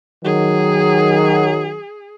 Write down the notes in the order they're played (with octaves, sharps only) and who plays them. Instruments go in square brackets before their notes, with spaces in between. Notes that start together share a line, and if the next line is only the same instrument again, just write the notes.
[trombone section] D#3 F#3 [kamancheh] G#4